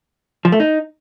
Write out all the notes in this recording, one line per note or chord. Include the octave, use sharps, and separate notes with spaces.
F3
A3
D#4